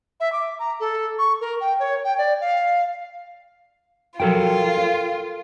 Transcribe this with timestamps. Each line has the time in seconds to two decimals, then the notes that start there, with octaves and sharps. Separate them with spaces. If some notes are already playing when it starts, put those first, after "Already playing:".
0.20 E5
0.32 D6
0.59 A#5
0.80 A4
1.18 C#6
1.41 A#4
1.60 G5
1.79 C#5
2.04 G5
2.18 D5
2.41 F5
4.20 F3 F#3 F4 A4 A#4 G5
4.78 C5